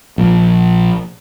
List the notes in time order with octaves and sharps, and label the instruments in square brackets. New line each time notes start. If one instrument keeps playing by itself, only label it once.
[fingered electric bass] A#1